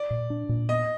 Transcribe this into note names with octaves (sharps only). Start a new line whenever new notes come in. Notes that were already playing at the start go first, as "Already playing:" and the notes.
Already playing: D5
A#2
D4
A#2
B3 D#5